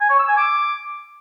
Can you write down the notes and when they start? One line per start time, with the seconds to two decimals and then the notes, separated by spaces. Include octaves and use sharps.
0.01 G#5
0.10 C#5
0.19 E6
0.28 G#5
0.37 D6